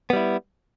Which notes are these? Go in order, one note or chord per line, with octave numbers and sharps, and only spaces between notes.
G3 B3 E4